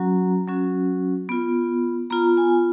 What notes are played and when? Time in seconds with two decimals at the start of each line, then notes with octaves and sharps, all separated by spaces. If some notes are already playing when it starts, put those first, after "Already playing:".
Already playing: F#3 C#4 F#4 A#5
0.48 F#3 C#4 F#4
1.29 B3 F4
2.10 B3 F4 A#5
2.37 G#5